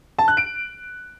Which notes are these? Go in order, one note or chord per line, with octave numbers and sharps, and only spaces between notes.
A5
F#6
D7